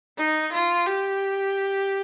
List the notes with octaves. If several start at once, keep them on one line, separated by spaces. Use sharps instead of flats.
D#4
F4
G4